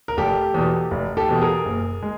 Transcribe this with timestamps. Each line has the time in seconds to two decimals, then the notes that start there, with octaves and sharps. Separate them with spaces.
0.08 A#4
0.17 F1 G4 A4
0.54 E2 B2
0.91 F1
1.17 G4 A4
1.29 E2 B2
1.41 G#4 A#4
1.66 F#1
2.02 G#3